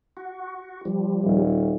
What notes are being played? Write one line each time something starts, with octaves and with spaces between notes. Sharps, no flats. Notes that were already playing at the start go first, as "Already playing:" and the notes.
F#4
F3 G3
D#1